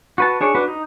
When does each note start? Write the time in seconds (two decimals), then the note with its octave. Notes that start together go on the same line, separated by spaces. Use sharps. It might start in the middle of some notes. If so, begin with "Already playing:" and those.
0.18 F#4 B4 A5
0.41 D4 G#4 C#5
0.55 D4 F#4 B4
0.68 D#4